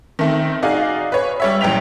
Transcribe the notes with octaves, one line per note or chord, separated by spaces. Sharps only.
D#3 A3 C4
D#4 F#4 G#4 D5 F5
B4 C#5
G3 C#5 E5
A#1 F#2 E3 G5 B6 F7